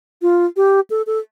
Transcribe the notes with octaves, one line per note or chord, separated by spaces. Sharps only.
F4
G4
A4
A4